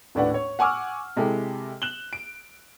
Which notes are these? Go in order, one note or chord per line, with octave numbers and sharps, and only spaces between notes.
D#1 A2 D4 B4 F#5
C#5
F#5 G#5 C#6 D6 E6 F6
C3 G#3 E4 G4 A4
F#6 E7 F#7 G7
D7